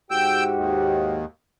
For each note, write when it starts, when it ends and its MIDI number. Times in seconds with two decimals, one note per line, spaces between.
0.11 1.23 44
0.11 1.23 66
0.11 1.23 67
0.11 0.44 79
0.11 0.44 88
0.11 0.44 91
0.55 1.25 39